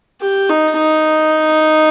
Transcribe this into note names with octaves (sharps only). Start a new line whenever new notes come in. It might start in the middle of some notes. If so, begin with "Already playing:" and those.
G4
D#4
D#4